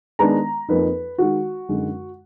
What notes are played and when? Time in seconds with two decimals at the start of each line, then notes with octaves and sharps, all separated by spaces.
0.19 D#3 G#3 B3 D4 A#5
0.69 F2 F3 A#3 D#4 B4
1.18 D#3 G#3 D#4 F#4
1.69 F#2 D3 G#3 D#4